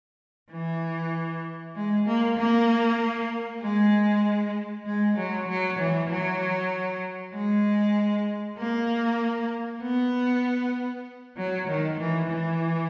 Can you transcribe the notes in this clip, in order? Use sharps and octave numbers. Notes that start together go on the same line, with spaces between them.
E3
G#3
A#3
A#3
G#3
G#3
F#3
F#3
E3
F#3
G#3
A#3
B3
F#3
D#3
E3
E3